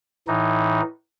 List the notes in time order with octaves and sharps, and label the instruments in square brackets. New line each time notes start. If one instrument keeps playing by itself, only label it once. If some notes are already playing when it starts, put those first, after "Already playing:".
[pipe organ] A2 E3 D#4